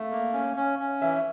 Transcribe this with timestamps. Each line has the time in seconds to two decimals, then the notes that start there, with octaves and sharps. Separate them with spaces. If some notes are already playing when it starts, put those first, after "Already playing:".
Already playing: A3 E5 F5
0.11 A#3
0.33 C#4
0.56 C#4
0.79 C#4
1.02 E3 E5